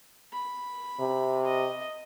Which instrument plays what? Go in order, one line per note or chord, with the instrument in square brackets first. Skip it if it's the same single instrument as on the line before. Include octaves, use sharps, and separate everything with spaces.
[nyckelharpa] B5
[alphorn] C3
[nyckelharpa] D#5